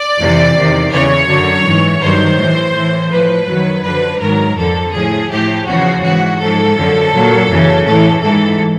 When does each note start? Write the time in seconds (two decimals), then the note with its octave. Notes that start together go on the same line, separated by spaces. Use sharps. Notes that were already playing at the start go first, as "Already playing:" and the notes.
Already playing: D5
0.19 F2 C3 E3
0.54 E2 C3 D#3
0.92 E2 C#3 E3 C#5
1.28 F#2 D3 F#3
1.64 G#2 E3
2.01 G2 D#3 F#3 C5
2.38 A2 E3
2.74 A2 E3
3.10 A2 F3 B4
3.47 F#2 D#3 F#3
3.84 F#2 D3 F3 B4
4.20 G#2 D#3 F#3 A#4
4.57 F2 D3 F3 A4
4.94 A2 F3 G#4
5.30 A2 F3 G4
5.67 E2 C#3 F3 F#4
6.03 G#2 E3 F#4
6.40 G#2 F3 A4
6.77 F#2 D3 F3
7.13 A#2 F#3
7.49 F#2 C#3 E3
7.86 A2 E3 A4
8.23 G#2 E3 A4